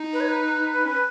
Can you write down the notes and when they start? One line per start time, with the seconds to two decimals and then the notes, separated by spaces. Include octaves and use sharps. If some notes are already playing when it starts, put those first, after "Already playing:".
Already playing: D#4
0.13 B4
0.20 C#5
0.28 B4
0.85 C#4